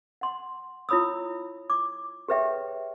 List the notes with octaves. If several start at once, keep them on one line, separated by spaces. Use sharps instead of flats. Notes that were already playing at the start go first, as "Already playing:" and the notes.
F#5 C6
E4 F4 C#5 B5 D#6 E6
D6
G4 G#4 B4 C#5 E5 G5